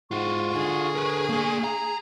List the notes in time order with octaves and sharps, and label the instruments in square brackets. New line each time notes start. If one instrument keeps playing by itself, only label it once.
[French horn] G#2 [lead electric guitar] F4 F#4 [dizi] C#6
[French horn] D3 [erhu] G#4
[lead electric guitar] A#4 B4
A#3 G#5
A#5